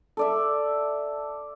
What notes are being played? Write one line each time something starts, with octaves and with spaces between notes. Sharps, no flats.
A4 D5 E5